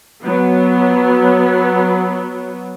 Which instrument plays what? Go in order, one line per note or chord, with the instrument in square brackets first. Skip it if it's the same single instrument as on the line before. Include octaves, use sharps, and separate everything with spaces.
[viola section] F#3 B3